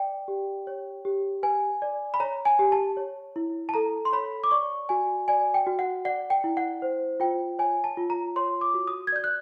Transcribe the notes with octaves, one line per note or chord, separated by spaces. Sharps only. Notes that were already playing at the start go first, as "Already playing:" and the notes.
Already playing: D5 G5
G4
C#5
G4
B4 G#5
D5
B5
C#5 A#5
G#5
G4
A5
C#5
E4
A5
A4 A#5
C6
C#5 B5
D6
D5 C#6
F#4 G#5
D5 G#5
G5
F#4
F#5
D5 F#5
G5
E4
F#5
C5
F4 G5
C#5 G#5
A5
F4
A#5
C#5 C6
D6
F#4
D#6
G#6
D5 G6
F#6